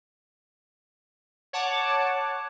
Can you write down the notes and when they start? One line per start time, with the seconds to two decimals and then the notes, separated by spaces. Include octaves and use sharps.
1.53 C#5 F#5 A5 D6